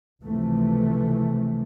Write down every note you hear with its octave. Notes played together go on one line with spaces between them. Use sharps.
C#2 C3 E3 F3 A3